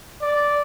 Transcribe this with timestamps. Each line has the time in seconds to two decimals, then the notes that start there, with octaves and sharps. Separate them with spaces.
0.22 D5